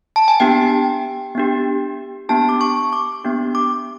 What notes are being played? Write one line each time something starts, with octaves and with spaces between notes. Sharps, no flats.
A5
G#5
B3 D4 G4 G5
B3 D4 G4
B3 D4 G4 A5
D6
C#6
D6
B3 D4 G4
D6